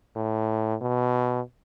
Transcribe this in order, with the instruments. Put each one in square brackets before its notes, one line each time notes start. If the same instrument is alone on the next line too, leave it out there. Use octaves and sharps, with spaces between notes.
[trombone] A2
B2